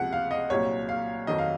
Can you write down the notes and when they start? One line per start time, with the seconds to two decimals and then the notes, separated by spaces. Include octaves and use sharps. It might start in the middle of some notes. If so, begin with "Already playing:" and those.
Already playing: C#2 C3 F3 F#5
0.13 F5
0.31 D#5
0.50 C2 A#2 F#3 C#5
0.89 F5
1.27 F2 D#3 F#3 D#5
1.38 F5